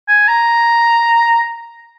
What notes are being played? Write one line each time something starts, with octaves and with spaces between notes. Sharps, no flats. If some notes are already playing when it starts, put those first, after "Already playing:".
G#5
A#5